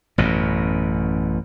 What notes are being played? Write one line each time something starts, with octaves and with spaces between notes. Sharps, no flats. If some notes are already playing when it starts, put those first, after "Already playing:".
A1 F#2 B2